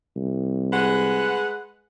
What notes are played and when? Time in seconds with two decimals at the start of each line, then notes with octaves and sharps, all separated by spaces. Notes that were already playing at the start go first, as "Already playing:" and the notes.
0.16 C2
0.73 G#3 B4 F#5